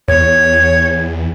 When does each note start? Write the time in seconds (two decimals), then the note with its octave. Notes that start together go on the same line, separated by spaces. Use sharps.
0.08 E2 C#5